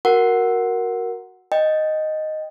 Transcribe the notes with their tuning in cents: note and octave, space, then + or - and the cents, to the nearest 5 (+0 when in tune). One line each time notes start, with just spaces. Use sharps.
F#4 +0 A#4 +0 F#5 +0
D#5 +0 G5 +0